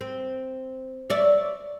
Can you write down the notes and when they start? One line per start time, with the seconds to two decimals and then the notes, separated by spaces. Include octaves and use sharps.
0.01 C4
1.10 C#5 D5 E5